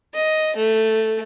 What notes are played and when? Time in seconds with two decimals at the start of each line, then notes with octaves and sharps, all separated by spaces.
0.14 D#5
0.56 A3